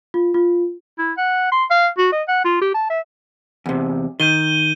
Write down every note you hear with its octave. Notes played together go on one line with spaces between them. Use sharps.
F4
F4
E4
F#5
C6
F5
F#4
D#5
F#5
F4
G4
A5
E5
E2 C3
D#3 G6 D#7 G7